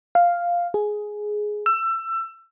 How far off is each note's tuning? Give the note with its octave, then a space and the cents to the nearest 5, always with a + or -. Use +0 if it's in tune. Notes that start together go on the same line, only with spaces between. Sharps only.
F5 +0
G#4 +10
E6 +25